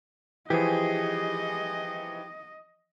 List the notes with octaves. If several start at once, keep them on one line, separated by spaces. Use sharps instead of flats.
E3 F3 G4 G#4 D#5